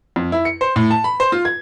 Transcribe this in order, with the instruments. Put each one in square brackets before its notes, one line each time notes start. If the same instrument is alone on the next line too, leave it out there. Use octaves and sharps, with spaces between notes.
[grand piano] F2
E4
C#7
C5
A2
A5
B5
C5
F4
G#6